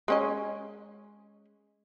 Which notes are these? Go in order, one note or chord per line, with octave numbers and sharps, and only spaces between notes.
G#3 C#4 D#5